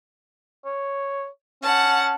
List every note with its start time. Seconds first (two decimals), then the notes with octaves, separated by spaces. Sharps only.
0.65 C#5
1.63 C#4 F#5 A5